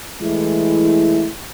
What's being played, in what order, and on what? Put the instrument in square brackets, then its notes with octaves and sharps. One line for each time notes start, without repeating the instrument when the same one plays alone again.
[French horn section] E3 G#3 A3 E4